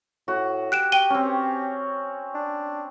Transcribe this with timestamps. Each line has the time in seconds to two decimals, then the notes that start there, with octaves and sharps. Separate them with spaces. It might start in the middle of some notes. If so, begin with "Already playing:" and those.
0.28 A2 F#4
0.72 G4 F#6 D7 E7
0.92 G5 D#7 G7
1.10 C4 C#4
2.35 D4